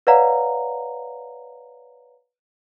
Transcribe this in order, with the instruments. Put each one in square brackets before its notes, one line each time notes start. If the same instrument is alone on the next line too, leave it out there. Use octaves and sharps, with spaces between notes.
[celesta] B4 C#5 D5 F5 F#5 A#5